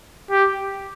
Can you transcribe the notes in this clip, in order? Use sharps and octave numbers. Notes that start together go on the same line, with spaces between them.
G4